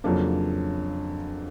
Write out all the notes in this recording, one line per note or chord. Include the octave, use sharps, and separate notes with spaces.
F2 C#3 F#3 A#3 D4